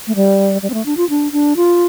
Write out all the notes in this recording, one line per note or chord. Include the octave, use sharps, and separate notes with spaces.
A3
G3
G3
C4
A3
D4
F4
D4
D4
F4